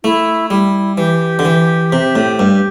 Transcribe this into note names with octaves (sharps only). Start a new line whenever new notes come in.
A3 E4
G3 E4
E3 G4
D3
E3
C3
A2
G2